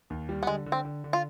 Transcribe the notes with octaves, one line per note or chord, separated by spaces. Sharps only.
D#2
G3
B3
D3 G#3
D3
C4
D3
D3
F4